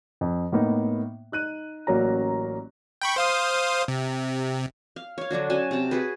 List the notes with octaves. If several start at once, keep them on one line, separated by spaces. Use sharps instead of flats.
F2
A2 A#3 B3 D#4
D#4 F#6 D#7
A1 F#3 A#3 C#4 D5 A#5
G5 B5 C#6
C5 F5 D#6
C3
F5
C#5 F5
D3 F#3 D4 F#4
C#4 F#4 G#5 A5
C3 A5
F#4 G#4 B4